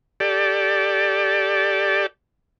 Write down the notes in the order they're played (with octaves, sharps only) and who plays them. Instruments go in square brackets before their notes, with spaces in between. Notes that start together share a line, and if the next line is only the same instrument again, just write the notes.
[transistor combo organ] G4 A4 D5